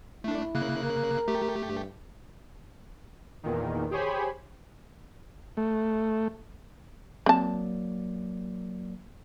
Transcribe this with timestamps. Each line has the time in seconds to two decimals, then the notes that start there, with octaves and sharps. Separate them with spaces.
0.24 A3 D4 E4
0.55 C#3 A#3 F#6
0.83 A#4
1.28 A3 G4
1.67 G2
3.43 E2 A#2 D#3
3.91 G4 G#4 C5 C#5 G#5 B5
5.57 A3
7.26 F#3 A#3 C4 D5 A5